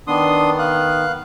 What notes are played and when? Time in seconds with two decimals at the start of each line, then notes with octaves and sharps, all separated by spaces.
0.07 D#3 B3 D4 C6 D#6
0.58 F5 F#6